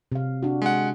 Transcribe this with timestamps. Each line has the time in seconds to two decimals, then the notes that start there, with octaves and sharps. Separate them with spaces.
0.12 C3 F5
0.43 D4 F#4
0.62 G#3 F#5